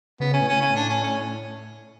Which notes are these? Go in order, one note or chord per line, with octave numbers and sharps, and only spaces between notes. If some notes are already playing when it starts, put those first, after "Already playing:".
C#3 B3
C#4
A2
C#4
C#4
D4
C#4
C#4